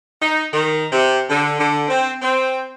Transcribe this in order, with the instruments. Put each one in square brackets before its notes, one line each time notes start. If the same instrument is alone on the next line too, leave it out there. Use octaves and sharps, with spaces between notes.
[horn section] D#4
D#3
C3
D3
D3
C4
C4